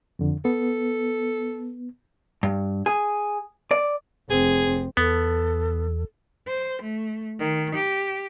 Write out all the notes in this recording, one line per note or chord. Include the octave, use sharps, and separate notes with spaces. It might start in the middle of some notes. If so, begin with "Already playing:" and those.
F2 D3
B3 A4
G2
G#4
D5
F1 C4 G#4
E2 B3 A4
C5
A3
D#3
G4